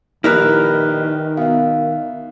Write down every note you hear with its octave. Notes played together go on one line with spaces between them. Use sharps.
A#1 D#3 G3 E4 A#4 B4 F6 F#6
B2 E5 F5